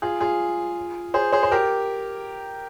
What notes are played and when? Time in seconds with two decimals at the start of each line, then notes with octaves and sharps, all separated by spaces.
0.02 F4 G#4
0.21 F4 G#4
1.14 G#4 C5
1.32 G#4 C5
1.43 C5
1.52 G4 A#4